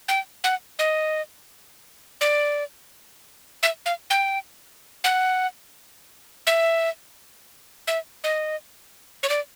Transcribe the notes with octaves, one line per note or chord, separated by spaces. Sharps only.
G5
F#5
D#5
D5
E5
F5
G5
F#5
E5
E5
D#5
C#5
D5